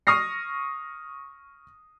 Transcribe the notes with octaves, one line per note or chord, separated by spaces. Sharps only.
C#6 D#6 F6 A#6 C7